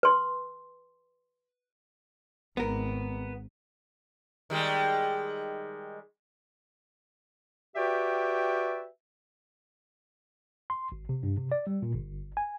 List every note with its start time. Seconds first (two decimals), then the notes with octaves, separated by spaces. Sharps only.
0.03 B4 C6
2.57 G#1 B3 A#4
4.50 D#3 G3 G#3
7.76 F#4 G4 B4 D5 E5 G5
10.70 C6
10.92 G#1
11.09 C3
11.23 G2
11.38 C3
11.52 D5
11.67 G3
11.82 A#2
11.94 G1
12.37 G#5